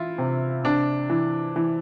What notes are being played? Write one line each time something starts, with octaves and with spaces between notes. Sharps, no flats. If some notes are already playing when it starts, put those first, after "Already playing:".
Already playing: E3 E4 F4
C3
C3 D4
E3
E3